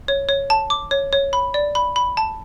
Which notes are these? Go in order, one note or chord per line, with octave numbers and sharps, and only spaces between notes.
C#5
C#5
A5
D6
C#5
C#5
B5
D5
B5
B5
A5